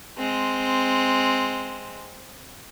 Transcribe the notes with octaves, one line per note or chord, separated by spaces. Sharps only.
G#3 C4